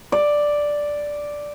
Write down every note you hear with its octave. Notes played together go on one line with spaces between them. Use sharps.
D5